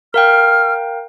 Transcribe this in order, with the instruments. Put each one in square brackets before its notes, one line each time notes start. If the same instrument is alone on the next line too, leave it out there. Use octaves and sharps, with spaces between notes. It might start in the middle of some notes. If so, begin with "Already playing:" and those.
[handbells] A#4 F5 G5 [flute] F6